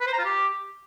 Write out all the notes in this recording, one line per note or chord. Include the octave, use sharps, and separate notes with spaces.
B4
C5
A#5
F4
G4